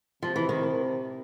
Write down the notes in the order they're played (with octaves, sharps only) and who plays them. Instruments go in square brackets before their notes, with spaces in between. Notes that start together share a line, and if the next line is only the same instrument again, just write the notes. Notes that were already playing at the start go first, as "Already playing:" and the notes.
[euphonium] C3 [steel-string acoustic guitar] F3
[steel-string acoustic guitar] E3
D#3